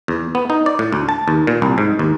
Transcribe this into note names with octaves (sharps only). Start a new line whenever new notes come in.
E2
B3
D#4
D5
A2
D2
A5
D#2
A#2
C2
G#2
D#2